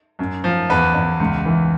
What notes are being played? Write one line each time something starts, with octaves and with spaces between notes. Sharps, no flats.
F#2
F3
E2 B4
E2
C#2
E3